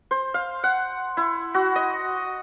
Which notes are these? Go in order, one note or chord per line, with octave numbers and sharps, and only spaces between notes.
C5
F5
F#5
E4
F#4
D#5